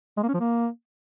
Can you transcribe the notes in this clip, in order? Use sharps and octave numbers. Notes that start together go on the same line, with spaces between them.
G#3
A#3
C#4
F3
A#3